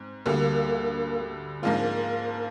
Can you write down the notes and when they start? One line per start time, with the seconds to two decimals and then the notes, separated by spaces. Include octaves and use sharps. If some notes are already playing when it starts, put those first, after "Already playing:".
Already playing: G#2 C4
0.25 D2 D3 G3 A#3
1.62 G#2 F3 G#3 A#3 D4 F4